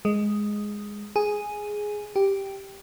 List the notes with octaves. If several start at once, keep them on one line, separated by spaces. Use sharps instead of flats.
G#3
G#4
G4